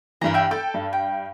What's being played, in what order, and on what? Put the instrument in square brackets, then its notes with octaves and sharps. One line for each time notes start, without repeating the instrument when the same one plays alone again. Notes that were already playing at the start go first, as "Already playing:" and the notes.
[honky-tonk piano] G2 E3 [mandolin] A#4 A#5
[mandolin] E5 G5
[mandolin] A4 [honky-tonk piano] G5
[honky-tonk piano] G2
[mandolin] G5